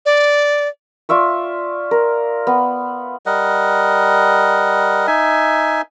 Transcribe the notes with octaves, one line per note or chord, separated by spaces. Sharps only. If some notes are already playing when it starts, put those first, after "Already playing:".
D5
F4 D5 E5 C#6
A#4
B3
G3 A#4 D#5 F#5
D#4 E5 G#5